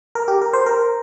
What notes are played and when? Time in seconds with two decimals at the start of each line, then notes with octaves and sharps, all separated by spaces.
0.15 A#4
0.28 G4
0.41 A#4
0.53 C5
0.66 A#4